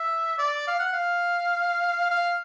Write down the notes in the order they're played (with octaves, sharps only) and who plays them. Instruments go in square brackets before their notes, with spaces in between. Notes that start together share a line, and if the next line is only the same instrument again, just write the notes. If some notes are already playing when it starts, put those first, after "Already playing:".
Already playing: [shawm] E5
D5
F5
F#5
F5
F5